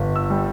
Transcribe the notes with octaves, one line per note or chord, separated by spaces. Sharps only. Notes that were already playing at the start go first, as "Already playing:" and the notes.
Already playing: G1
E6
G3